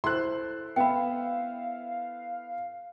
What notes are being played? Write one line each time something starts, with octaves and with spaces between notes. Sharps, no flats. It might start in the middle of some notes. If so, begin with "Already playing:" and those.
E4 A4 C5 C6 F#6
B3 E5 F5 G5 B5